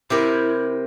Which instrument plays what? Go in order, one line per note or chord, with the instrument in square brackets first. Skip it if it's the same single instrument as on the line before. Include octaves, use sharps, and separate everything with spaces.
[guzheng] C3 G4 A#4 [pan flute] E4